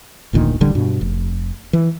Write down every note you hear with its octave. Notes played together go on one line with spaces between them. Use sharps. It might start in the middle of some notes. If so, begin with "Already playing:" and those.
F1 D2 A#2 D#3
D1 A1 D3 G3
G2 B2
F1
E3